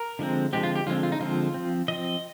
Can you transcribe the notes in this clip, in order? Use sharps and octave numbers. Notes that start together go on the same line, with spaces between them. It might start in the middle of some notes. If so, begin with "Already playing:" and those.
Already playing: A#4
D3 F3 G#3 C4
D3 F3 G#3 C4 G4
F4
G4
D3 F3 G#3 C4 F4
F4
D#4
D3 F3 G#3 C4 F4
F3 C4
F3 C4 D#5